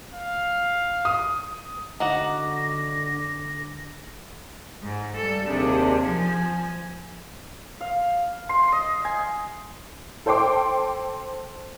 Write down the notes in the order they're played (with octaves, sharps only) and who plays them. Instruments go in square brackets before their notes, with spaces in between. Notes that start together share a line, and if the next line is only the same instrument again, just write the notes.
[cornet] F5
[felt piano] D#6
[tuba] D3 [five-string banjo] D#4 F#4 F#5 [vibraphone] D6 [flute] A#6
[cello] G#2
[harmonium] G2 [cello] A4
[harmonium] D#2 D4 G#4 [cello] C3
[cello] F3 [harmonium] G#5
[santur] F5
C6
D#5
G#5
[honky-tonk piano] A4 C5 G5 C6 D6